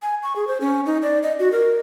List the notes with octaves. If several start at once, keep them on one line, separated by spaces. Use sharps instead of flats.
G#5
C#6
G#4
C5
C#4
D#4
D5
D#5
F#4
A#4